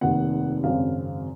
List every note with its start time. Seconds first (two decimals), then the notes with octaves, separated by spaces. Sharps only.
0.01 F1 D#2 D#3 F#5
0.64 G#1 F#2 C#3 F#3 C4 F5